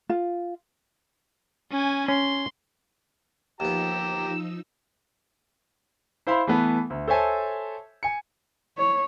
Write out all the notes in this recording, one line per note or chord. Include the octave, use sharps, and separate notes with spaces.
F4
C#4 G#5
C#4 C6
D#2 F3 B3 D#4 G4 A#5 E6 E7
E4 C5 F5 B5 C6
E3 A3 B3
D2
A4 C5 C#5 E5 G#5 A5
G#5 C#7
C#5